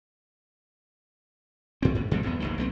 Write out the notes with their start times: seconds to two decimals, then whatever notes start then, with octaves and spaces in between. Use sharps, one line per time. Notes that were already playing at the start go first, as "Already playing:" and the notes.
1.82 G#2 C4
1.95 G#2
2.11 F2 A2 G#3 C4
2.23 G1 E2 C3 B3
2.40 F1 D#2 D#3
2.58 B1 A3 C4